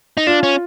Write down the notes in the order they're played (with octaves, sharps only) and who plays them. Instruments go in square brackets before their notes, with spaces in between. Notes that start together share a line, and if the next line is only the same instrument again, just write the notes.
[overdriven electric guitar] D#4
[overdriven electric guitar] D4 [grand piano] F4
[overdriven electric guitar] C#4